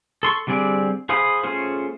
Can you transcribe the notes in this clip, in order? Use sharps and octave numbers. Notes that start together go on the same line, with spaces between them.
A4 C6 C#6
D3 G3 C4 G#4 D5
G#4 C5 F5 B5 D#6
A3 C#4 F4 G#4 C5